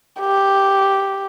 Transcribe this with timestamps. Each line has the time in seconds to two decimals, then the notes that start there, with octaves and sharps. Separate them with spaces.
0.20 G4